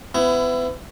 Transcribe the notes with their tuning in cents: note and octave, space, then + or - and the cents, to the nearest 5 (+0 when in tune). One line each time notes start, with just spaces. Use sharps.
B3 +35 E4 +20